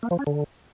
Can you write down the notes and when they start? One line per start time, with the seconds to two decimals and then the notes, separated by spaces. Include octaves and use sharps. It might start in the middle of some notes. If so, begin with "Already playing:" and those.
0.03 A#3
0.11 F3
0.19 C#4
0.27 D3